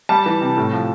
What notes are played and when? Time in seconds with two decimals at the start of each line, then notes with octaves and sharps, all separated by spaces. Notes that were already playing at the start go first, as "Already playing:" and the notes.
0.09 G3 A5
0.26 E3
0.41 C3
0.57 A2
0.73 F3